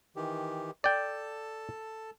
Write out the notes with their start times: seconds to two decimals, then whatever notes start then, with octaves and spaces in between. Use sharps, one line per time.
0.16 D#3 E3 G4
0.84 A4 D5 G5 A5